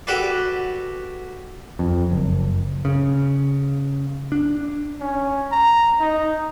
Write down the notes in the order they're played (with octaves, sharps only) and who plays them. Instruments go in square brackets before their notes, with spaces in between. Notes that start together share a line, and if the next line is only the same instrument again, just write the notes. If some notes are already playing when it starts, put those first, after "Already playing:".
[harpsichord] F#4 G4 A4 B4 D5
[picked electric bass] F2
F#1
C#3
D4
[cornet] C#4
A#5
D#4